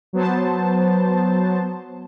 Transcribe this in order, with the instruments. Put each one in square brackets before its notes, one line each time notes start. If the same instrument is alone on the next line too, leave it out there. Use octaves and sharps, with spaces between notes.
[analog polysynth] F#3 B3 C5 A5